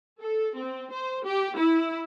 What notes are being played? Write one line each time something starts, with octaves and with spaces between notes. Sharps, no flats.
A4
C4
C5
G4
E4